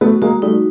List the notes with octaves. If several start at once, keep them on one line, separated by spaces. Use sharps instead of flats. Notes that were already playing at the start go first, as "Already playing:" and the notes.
A3 B3 F#4
G#3 A#3 F#4
G3 A3 D#4